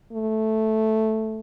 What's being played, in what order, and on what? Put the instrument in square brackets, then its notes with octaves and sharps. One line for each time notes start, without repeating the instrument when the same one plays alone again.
[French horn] A3